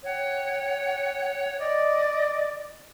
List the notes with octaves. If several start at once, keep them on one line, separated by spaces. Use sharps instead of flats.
C#5 F#5 G5
D5 D#5